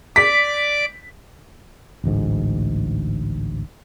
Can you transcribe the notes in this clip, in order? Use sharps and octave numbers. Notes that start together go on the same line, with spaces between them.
D5 D6 B6
A1 D2 G#2